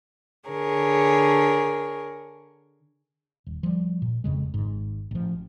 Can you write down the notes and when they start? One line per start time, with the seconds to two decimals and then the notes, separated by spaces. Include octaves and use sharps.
0.48 D3 G#4 A#4 C#5
3.46 D#1
3.63 F3 G3
4.02 A#2
4.24 F1 F2 C#3 G#3
4.54 G#1 G#2
5.11 A1 F3